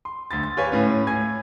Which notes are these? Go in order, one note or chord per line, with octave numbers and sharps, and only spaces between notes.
C6
D2 C6 A6
A6
G4 B4 C#5 F5 G#5
A2 C#4
A2 G#5 G#6